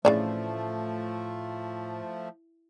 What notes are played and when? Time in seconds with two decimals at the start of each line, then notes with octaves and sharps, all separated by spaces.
0.05 A2 C#3 E3 F3 A3 D4 D5